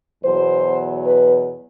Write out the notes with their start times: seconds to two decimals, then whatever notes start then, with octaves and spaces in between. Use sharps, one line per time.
0.23 E2 B2 F#3 C5
1.04 B4